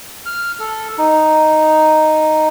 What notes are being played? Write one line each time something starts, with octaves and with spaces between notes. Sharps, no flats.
F6
A4
D#4